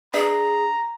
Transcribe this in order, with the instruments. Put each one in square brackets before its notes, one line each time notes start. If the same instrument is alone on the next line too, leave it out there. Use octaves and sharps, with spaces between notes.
[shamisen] D4 B4 E5 [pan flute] G#4 [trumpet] A#5